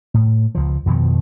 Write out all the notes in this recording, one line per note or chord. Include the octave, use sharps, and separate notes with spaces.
A2
C#2 F3
F2 B2 D#3 F3